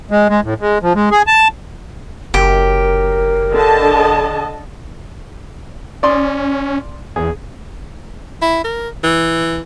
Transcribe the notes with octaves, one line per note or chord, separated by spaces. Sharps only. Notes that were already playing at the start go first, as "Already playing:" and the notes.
G#3
G#3
A2
G#3
F3
G#3
G#4
A5
F#1 G4 A#4
D3 D#5 A5
C#4 D5 C6 D#6
E2 G#4
E4
A#4
E3